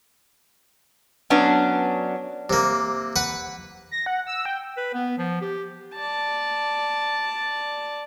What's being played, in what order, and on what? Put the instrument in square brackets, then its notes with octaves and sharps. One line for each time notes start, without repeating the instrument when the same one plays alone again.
[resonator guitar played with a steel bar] F#3 B3 C#4 D4
[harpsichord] C3 A#3
B4 F#5
[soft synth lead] A#6
F#5
E6
G5
[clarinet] B4
B3
F3
G4
[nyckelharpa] D5 A5